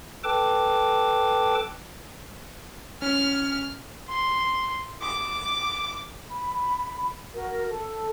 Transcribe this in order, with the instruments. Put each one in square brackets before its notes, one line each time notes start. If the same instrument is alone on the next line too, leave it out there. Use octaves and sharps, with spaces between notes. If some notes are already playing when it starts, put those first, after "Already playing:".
[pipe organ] A4 B4 G5 A5 D6
[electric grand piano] C#4 [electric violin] F6
[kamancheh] C6
D6
[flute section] B5
F#4 A#4
A4